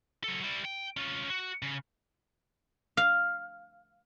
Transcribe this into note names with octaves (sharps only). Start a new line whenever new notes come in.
F#3 A4
G3 E4
G5
C#4 F4
F#4
C#3
F5